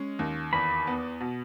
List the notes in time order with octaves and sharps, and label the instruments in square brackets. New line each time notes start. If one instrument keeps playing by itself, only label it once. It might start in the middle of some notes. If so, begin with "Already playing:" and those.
Already playing: [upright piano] G#3 C#4
D#2
[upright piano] E2 [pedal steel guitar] B5
[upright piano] B3
B2